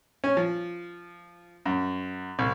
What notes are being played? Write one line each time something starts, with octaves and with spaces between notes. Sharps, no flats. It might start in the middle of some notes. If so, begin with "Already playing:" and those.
C#4
F3
F#2
C2